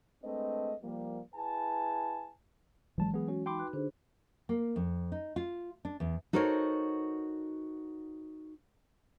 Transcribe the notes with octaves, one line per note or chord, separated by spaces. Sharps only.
G#3 A3 C4 D4 B4 D#5
F3 G3 A#3
E4 G#4 B4 G#5 A5
G#1 E3 F#3 G#3 A5
B3 G#4
C#4 F#4
D#4 G5 B5 C6 D6
F#4 B4 F#6
D3 D4 G#4 C5
A#3
F2
D#4
F4
D4
E2
D#4 F#4 A4 A#4 C5 C#5